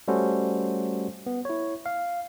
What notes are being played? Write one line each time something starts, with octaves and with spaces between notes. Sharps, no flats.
G3 A3 C#4 F#4 A4 C5
B3
E4 C#5
F5